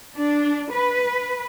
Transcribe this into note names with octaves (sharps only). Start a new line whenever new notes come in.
D4
B4